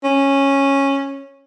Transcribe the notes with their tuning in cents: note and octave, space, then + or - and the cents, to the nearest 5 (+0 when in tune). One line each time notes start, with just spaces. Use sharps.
C#4 -10